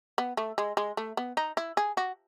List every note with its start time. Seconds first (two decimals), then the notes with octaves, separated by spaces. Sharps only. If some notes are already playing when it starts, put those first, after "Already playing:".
0.18 B3
0.37 A3
0.58 G#3
0.77 G#3
0.97 A3
1.17 B3
1.37 D#4
1.57 E4
1.77 G#4
1.97 F#4